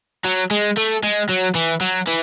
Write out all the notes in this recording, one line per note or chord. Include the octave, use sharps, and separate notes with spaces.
F#3
G#3
A3
G#3
F#3
E3
F#3
E3